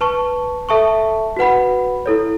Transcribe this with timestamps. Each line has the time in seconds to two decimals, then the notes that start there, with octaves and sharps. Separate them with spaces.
0.01 B4 A5 C#6
0.69 A4 E5 A5 C#6
1.37 F#4 B4 F#5 B5
2.06 E4 A4 C#5